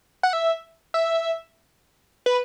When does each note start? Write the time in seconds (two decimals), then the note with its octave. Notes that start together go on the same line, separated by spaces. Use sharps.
0.23 F#5
0.33 E5
0.94 E5
2.26 B4